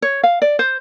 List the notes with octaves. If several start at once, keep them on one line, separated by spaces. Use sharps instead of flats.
C#5
F5
D5
C5